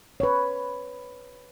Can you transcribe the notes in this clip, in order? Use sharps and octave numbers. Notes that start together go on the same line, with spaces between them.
B4 C#5